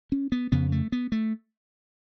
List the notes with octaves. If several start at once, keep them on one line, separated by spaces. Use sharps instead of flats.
C#4
B3
F2 C#3 B3
A3
B3
A3